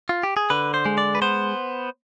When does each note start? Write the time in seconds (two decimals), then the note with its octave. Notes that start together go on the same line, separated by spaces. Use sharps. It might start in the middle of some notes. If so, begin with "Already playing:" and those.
0.09 F4
0.23 G4
0.37 G#4
0.50 D3 B4
0.74 C5
0.86 G#3
0.98 D5
1.15 B4
1.22 B3 C5